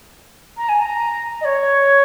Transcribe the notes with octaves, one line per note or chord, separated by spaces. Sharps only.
A#5
G#5
A#5
D#5
C#5